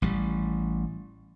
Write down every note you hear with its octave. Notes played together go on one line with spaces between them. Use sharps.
A1 G3